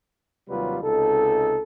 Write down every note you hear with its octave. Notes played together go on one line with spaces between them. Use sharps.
D#2 C3 F#3 G3 F4 B4
C#2 C3 D#4 A4